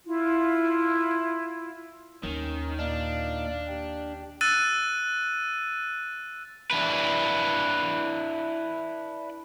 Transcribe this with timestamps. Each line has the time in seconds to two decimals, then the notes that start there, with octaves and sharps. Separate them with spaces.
0.05 E4 F4
2.23 D#2 D#3 C#4
2.79 A#2 D4 D#4 F5
3.67 G4
4.41 E6 F#6 A6 D#7
6.71 D4 E4 B4